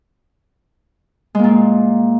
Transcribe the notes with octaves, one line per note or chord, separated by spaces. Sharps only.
A#2 G#3 A#3